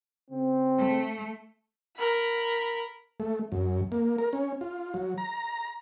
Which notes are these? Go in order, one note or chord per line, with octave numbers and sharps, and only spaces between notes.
C#3 C4
A3
A#4 B5
A3
F#2
A#3
A#4
C#4
F4
F#3
A#5